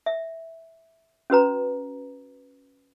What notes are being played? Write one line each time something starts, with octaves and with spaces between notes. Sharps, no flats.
E5
C#4 F#4 B4 A#5